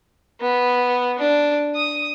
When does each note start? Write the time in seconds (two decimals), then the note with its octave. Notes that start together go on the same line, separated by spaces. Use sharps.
0.41 B3
1.19 D4
1.75 D#6